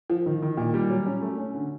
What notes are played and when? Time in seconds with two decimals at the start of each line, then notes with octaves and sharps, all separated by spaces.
0.10 F3
0.26 D#3
0.42 D#3
0.57 A#2
0.74 G3
0.90 F#3
1.06 C#4
1.22 A3
1.38 C#4
1.54 D3